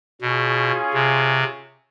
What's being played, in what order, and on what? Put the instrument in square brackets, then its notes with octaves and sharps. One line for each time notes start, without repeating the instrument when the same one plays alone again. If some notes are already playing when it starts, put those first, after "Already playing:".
[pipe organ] B2 [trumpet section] C#4 F4 G#4
[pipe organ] C3